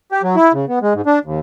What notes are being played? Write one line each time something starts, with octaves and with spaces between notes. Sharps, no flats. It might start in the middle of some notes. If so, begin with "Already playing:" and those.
G4
F#3
E4
C#3
B3
G#3
G#2
D4
D#2